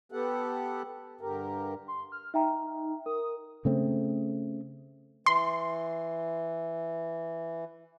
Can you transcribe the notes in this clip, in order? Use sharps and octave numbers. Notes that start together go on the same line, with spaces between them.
B3 G4 A4 F#5
G2 D3 G4 A#4
C6
F6
D#4 E5 G5 A#5
A#4 D#6
C#3 A3 C4
E3 C6